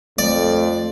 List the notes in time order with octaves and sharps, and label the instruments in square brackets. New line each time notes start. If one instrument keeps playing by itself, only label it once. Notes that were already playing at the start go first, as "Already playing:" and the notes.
[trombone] F2 [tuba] A3 [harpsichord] D5